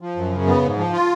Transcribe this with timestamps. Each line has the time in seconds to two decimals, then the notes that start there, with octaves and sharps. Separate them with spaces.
0.01 F3
0.16 F#2
0.32 C#3
0.47 B3
0.63 G#2
0.78 F3
0.93 F4